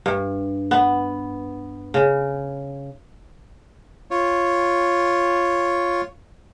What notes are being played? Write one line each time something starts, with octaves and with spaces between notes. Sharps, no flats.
G2
B3
C#3
F4 C#5